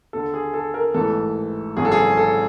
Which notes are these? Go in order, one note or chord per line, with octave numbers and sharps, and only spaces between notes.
D#2 D3 A4
G#4
A4
A#4
A1 G#2 E3 A4
G#1 F#2 C#3 E3 G#4
A4
G#4
A4